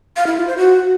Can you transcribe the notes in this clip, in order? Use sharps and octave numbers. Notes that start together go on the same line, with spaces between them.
F5
E4
F4
C5
F#4